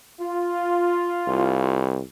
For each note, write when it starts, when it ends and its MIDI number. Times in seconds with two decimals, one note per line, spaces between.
0.21 1.83 65
1.27 2.01 36